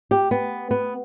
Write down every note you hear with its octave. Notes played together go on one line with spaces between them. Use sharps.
G4
B3
B3